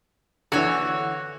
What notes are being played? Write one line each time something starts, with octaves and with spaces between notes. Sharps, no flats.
D3 E3 F#4 C#5